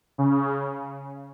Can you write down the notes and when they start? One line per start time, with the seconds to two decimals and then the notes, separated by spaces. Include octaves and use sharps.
0.18 C#3